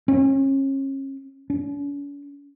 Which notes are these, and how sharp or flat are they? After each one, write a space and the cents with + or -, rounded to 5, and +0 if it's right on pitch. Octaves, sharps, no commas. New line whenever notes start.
C#4 -35
C#4 +45